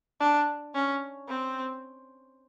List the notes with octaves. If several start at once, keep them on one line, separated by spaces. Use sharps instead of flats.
D4
C#4
C4